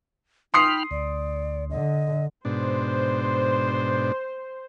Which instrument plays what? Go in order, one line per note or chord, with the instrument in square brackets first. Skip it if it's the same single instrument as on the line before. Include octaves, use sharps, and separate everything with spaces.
[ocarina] D#4 [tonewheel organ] G5 B5 F6 [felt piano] C6 D#6 C7
[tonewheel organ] D2 [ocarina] D5
[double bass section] D3 [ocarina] D#5
[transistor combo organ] G#2 B2 D4 [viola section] C5